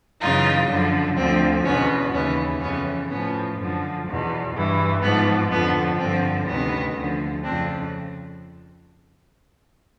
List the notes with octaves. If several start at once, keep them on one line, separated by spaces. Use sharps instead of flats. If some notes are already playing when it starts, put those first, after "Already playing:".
F#2 C#3 E3 D#4 F4
F#2 D3 F3
D2 D3 F3 C4
E2 B2 B3 C#4
D#2 C#3 E3 B3 C#4
F2 C#3 E3 B3 C#4
A2 F3 B3 C#4
F#2 D3 F3
E2 B2
G2 E3
G#2 F3 B3
F2 D3 F3 B3
G2 D3 F3 C4
D2 C3 D#3 B3 C#4
D2 D3 F3
F2 C#3 F3 C4 D4